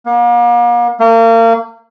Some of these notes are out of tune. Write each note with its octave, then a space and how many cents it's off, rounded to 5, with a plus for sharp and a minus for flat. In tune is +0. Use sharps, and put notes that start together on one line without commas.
A#3 +40
A#3 -35